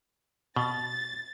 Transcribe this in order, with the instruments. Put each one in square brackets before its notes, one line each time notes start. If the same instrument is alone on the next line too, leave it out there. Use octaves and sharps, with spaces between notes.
[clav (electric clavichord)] B2 [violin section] A6